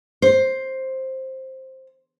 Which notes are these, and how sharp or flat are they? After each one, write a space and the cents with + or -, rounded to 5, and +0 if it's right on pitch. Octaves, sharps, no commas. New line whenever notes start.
C5 +10